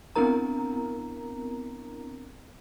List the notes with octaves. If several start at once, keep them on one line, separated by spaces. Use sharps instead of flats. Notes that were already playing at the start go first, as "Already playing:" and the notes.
B3 C4 D4 E4 A#4 A#5